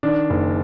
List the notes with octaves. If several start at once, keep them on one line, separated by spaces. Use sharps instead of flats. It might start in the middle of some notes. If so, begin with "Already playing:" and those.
D#3 D4
F#1